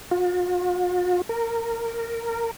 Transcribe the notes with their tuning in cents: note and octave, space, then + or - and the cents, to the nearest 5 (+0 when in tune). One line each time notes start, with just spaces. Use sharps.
F4 +45
A#4 -15